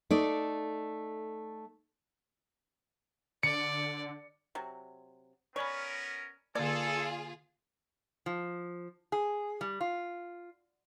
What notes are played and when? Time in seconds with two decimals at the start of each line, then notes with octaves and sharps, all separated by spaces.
0.11 A3 D#4 D5
3.43 D3 D5 C#7
4.55 C3 F#3
5.56 B3 C#4 A#4 C#5 D5 G#5 B5
6.55 D3 A#3 F4 G#4 A4 D5
8.26 F3
9.12 G#4
9.61 G3
9.81 F4